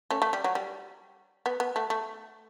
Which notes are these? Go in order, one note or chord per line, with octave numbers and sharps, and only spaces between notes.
A3 C#4
A3
G3
F#3
G3
B3
B3
A3
A3